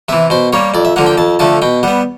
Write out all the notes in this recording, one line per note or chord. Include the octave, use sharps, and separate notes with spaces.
C3 E3 E5
B2 C5
G3 A#3 C#5
F2 D5
E5
D3 F3 A#3 F#5
G5
F2 A5
D3 F3 A3 A5
B2 G5
G3 B3 F#5